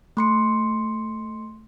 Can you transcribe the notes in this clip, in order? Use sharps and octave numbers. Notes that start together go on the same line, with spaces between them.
A3 C6 C#7